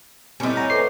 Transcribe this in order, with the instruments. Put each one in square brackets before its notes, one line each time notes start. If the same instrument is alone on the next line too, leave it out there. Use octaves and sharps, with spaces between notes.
[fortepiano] A2 C3 G3 [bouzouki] C#4 D#4
[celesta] F#5 [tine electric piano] G#5 A#5
[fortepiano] A3 C5 [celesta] A4 B4 D6 [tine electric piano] C7